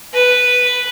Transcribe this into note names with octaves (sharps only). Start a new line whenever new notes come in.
B4